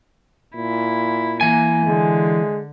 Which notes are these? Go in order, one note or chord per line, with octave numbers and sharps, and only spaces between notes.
A#2 E4
E3 A#3 G#5
D3 G#3